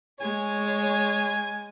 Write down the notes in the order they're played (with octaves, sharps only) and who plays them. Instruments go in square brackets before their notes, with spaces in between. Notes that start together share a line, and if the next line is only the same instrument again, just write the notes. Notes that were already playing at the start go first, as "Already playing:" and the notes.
[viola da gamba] G#3 [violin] C#5 [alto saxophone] G#5